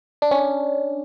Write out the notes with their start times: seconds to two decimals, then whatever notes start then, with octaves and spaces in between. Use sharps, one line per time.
0.22 D4
0.31 C#4